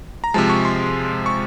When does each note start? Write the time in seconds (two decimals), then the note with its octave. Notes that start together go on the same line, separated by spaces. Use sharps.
0.24 A#5
0.34 C3 F3 G#3 A5
0.50 C#6
0.65 C6
1.26 C#6